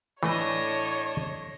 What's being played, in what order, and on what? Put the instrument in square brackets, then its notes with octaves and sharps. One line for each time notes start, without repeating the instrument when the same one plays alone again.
[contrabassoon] A2 [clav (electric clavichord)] E3 A3 [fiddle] D4 D#5 [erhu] C#5